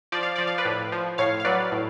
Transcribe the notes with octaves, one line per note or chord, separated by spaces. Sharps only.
F3 D5
F5
F3 D5
F5
B4 D5
A2
F3
A2 C#5 F5
F5
F#3 B4 D5
A2